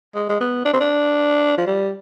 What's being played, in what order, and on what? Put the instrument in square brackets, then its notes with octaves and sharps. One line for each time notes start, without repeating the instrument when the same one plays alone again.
[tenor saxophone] G#3
G#3
B3
D4
C4
D4
F3
G3